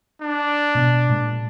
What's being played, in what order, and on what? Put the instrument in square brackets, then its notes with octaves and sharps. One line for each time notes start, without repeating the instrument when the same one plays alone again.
[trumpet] D4
[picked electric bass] B2 B3
A#2 G#3